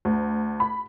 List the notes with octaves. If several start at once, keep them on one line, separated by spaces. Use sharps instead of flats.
D2
B5